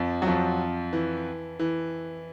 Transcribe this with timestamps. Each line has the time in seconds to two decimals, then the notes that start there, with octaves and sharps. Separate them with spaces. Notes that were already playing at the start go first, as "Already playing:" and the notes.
Already playing: F2 F3
0.22 F#3
0.27 F2 F3
0.93 E3
1.60 E3